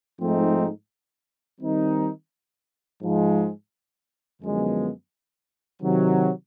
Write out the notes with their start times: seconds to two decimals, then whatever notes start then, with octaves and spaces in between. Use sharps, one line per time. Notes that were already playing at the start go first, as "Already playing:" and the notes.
0.19 G#2 F3 A3 C4 D#4
1.60 D#3 G3 C4 D#4
3.01 G#2 F3 G#3
4.41 F#2 D3 F3 G#3 B3
5.81 C3 D#3 F#3